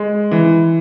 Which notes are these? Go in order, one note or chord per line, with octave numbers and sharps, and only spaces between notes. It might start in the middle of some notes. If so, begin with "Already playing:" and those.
Already playing: G#3
E3